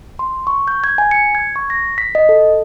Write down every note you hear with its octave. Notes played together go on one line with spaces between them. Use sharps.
C6
C#6
G6
G#6
G#5
C#7
G#6
C#6
A#6
B6
D#5
A4